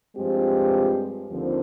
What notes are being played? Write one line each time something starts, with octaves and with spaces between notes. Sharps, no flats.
G2 F3 G#3 C4 G4
D#2 D3 F3 C4